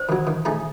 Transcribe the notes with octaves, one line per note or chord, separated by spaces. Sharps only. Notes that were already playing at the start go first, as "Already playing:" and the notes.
Already playing: C5
D#3 F#3
D#3
A3 D#4 G#4 D#5